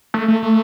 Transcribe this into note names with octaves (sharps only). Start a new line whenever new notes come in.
A3
A3
A3